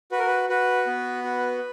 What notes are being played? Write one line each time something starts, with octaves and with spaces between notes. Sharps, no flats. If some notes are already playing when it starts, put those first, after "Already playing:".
F#4 B4
A#4
B4
F#4 B4
B3
F#4